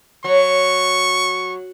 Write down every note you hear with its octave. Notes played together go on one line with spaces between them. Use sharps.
F#3 C#6